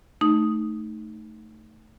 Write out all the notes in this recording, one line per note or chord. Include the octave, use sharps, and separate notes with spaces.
A3 D#4 D#6